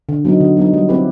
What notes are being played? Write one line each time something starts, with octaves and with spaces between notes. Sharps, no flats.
D3
F#3 B3 D#4
D3
F#3 B3 D#4
G3
C4 E4 G4 B4